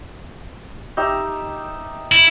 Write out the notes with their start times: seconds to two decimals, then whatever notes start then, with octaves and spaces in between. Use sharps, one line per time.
0.97 D#4 G4 E5
2.12 E4